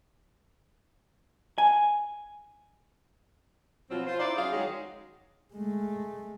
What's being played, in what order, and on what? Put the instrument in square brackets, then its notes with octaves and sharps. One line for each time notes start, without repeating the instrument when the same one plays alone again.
[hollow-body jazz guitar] G#5
[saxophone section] B2 F3 F#3 C4 F4
F4 C5
D#4 E4 C5 D5
F#3 C#4 G#4 F5
D#3 F#3 G#3 F#4 G#4
[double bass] G#3 A3